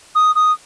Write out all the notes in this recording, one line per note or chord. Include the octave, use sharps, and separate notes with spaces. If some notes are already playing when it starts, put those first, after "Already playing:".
D#6
D#6